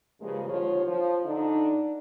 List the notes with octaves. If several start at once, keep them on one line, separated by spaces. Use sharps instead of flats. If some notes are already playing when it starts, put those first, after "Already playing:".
G2 C#3 F3 G#3 A#3
D#2 D3 F3 F4 C#5
F3
D3 D4 D#4